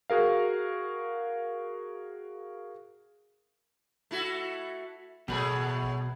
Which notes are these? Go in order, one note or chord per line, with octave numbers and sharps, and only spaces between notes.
F#4 G#4 A#4 F5
A3 E4 F#4
A1 B2 F#3 A3 G#4 B4